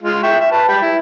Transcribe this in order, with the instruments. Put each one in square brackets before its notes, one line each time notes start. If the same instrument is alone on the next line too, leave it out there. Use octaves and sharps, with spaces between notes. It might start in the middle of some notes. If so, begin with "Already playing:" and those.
[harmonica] G#3 F4
E5 G5 C#6
E5
B4 A5
G3 G5 B5
E4